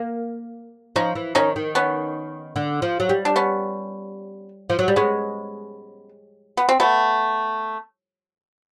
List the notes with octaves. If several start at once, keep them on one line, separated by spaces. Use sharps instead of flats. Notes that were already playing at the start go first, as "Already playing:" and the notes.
Already playing: A#3
F3 C#4 D#4
E3
D#3 C#4 D#4
D#3
B3 C#4
D3
F3
F#3
G3
D4
B3 C#4
F3
F#3
G3
G#3 B3 C#4
B3
C4
A3 B3